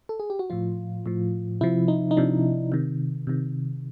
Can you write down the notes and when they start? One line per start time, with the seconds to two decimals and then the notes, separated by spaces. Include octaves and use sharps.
0.09 A4
0.20 G#4
0.30 G4
0.39 F#4
0.50 A2 F3 F4
1.06 A2 F3
1.61 C3 F3 E4
1.88 D#4
2.11 D#4
2.17 C3 F3 D4
2.72 C3 D#3
3.27 C3 D#3